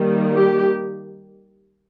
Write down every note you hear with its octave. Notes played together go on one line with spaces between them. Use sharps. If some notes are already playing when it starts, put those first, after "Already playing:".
Already playing: D#3 G3 A#3
G4